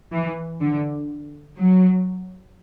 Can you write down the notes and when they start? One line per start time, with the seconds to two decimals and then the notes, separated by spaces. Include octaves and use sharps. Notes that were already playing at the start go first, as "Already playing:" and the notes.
0.12 E3
0.61 D3
1.59 F#3